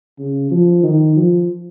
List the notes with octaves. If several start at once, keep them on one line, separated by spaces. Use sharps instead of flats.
C#3
F3
D#3
F3